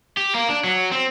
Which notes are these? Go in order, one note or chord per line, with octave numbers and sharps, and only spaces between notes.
G4
A#3
D4
F#3
C4